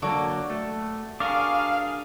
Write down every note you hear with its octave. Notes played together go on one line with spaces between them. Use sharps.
D3 F#3 A#3 F#4 A4 D5
A3
D4 G#4 A#4 F5 C#6 D6